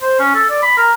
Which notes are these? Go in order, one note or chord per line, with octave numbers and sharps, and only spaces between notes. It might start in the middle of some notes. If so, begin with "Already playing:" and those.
C5
C#4
A4
D5
B5
A#4